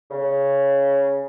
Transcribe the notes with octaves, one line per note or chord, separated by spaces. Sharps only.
C#3